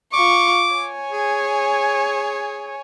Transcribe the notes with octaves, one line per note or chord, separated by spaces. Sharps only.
F4 C#6 D6
C#5 G#5
G#4